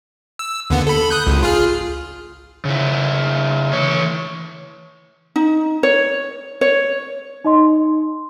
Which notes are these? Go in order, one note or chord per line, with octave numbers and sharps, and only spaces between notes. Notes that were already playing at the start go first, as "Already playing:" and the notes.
E6
D#2 D3 B3
A4 B5
D#6 F#6 G6
G#1 C#2
F4 G#4 F6
C#3 E4
E3 C#5
D#4
C#5
C#5
D#4 D#5 C6